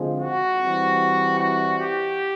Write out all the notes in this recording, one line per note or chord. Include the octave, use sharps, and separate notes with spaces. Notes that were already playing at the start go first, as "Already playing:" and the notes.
Already playing: D3 F3 G#3 C4
F#4
E3 G3 C4
F#4
G4